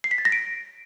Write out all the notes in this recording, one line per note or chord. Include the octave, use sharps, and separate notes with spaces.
C7
B6
A6
A#6
D7